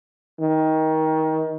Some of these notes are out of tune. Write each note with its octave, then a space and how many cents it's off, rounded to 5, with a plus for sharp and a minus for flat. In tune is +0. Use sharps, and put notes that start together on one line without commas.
D#3 +20